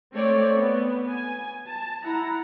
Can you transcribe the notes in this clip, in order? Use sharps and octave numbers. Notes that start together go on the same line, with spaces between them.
A3 C4 C#5 D5
B3
G#5
A5
E4 F#5 A#5